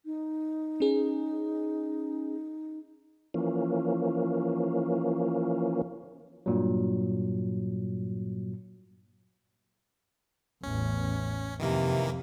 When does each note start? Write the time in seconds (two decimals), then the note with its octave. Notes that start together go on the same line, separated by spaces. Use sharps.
0.06 D#4
0.80 C#4 G#4
3.34 E3 F3 A#3 C#4
6.46 G2 A#2 F#3
10.63 A1 E2 C#4
11.60 F2 C3 D#3 E3 A#3